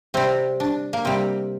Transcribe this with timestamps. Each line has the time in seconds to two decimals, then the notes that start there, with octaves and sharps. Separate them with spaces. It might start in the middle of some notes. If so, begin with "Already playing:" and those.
0.14 C3 G3 C4
0.60 D4
0.93 A#3
1.05 C3 G3 C4